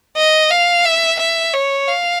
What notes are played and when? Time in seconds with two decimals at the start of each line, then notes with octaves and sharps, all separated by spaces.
0.17 D#5
0.51 F5
0.85 E5
1.19 E5
1.54 C#5
1.88 F5